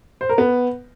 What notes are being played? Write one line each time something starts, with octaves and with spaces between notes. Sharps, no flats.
C5
A#4
B3